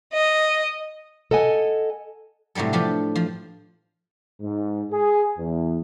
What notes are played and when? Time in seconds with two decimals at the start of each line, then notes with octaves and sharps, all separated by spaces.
0.14 D#5
1.31 A4 D#5 F#5 G#5
2.55 A2 C3 F#3 G3 A4
2.73 F3 D4 G4 A4 B4
3.15 F3
4.41 G#2
4.91 G#4
5.37 E2